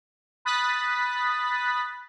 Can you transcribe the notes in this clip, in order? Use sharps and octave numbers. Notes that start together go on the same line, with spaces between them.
B5 D#6 F#6 A6 B6